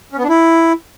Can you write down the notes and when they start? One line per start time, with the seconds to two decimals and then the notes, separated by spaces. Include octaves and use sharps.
0.12 C#4
0.18 B3
0.23 D4
0.29 E4